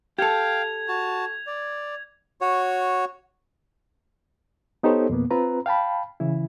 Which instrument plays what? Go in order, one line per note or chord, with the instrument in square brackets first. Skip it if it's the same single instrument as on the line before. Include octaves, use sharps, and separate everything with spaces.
[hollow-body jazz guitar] G4 A4 [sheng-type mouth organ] F5 G5 [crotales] G#6 F7
[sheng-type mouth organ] F#4 A5
D5
[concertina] F#4 C#5
[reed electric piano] B3 D#4 G4 A4 C5 C#5
F2 B2 A#3 B3
C4 F4 B4 A#5
F5 G5 A5 B5
C#3 E3 E4